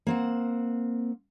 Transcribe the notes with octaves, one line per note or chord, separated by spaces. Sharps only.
A#3 C4 F#5